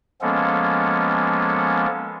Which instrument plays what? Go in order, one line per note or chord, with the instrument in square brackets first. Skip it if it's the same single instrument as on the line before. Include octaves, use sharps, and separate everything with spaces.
[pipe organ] F3 G#3 A#3 B3 C#4 A4